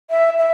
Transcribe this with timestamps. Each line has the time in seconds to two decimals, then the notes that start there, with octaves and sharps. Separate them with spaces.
0.10 E5
0.39 E5